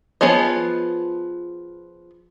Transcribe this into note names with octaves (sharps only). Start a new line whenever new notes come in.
F3 B3 G#4 C#5 D#5